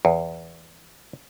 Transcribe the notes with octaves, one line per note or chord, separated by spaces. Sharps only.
E2